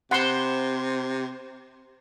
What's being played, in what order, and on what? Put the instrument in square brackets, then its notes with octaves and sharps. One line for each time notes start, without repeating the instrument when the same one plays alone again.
[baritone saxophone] C3 [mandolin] C5 B5 [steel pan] F#5 C6